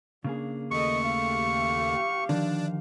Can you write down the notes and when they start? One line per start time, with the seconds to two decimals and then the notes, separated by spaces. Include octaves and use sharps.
0.24 C#3 A#3 D4 G#4
0.71 D#2 A3 D#5 C#6
1.05 G4 F5
2.29 D3 D#3 F3 D4